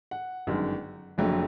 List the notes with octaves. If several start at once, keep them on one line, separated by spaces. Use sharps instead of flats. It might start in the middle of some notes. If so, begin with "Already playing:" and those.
F#5
G1 F#2 D#3 G#3
F#1 F2 D3 F#3 A3